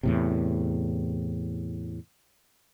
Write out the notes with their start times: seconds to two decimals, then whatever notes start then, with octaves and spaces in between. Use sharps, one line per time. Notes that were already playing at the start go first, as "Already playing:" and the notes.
0.03 E2 A2 C3